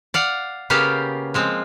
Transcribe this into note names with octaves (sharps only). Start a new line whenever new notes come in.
D5 F5 F#5
C#3 A#3 B3 G4 D5 F5
F3 G#3 C4